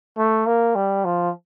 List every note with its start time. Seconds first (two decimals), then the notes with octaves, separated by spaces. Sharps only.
0.18 A3
0.46 A#3
0.75 G3
1.05 F3